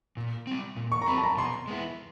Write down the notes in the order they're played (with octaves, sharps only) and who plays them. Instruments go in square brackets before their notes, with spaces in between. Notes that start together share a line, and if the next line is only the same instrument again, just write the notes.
[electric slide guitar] A#2
G3 C4
A#2
[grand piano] C#6
A#5
[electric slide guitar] G3 C4 [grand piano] B5
[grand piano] A5
A#5
[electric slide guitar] B2 [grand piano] C6
[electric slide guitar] G#3 B3 E4